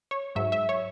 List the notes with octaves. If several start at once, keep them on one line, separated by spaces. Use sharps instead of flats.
C#5
G#2 F#3 E5
E5
C#5